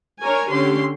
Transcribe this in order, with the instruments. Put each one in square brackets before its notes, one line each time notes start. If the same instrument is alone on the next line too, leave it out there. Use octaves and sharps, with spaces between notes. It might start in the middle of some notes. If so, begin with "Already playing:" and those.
[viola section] D4 A#4 C#5 G#5
D3 C#4 G4 C6